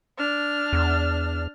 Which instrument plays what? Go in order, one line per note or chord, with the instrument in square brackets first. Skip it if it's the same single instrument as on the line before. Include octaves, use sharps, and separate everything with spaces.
[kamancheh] D4 F6
[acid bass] E2